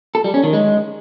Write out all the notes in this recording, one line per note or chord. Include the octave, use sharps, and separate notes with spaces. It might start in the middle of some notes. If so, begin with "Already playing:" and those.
A4
G3
C#4
D#3
G#3